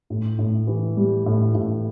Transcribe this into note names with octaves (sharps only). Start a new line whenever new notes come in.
A2
A2
E3
G3
A2
A2